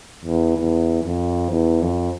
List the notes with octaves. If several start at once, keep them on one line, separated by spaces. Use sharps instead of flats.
E2
E2
F2
E2
F2